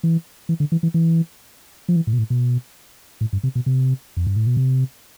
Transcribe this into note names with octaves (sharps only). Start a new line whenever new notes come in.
E3
E3
D3
E3
E3
E3
F3
E3
A2
B2
A2
B2
A2
G2
C3
B2
C3
F2
G2
A2
B2
C3